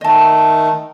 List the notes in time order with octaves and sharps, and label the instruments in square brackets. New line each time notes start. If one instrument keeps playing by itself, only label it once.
[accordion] D#3 A3 [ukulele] D#5 A5